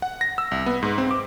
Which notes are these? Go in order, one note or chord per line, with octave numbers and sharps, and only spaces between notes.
F#5
A#6
E6
C2
B3
G#2
C4
D6